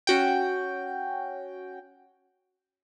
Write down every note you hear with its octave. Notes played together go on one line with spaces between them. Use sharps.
C#4 F#4 G5